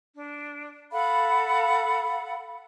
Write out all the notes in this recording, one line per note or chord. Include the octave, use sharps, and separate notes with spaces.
D4
A4 F5 F#5 B5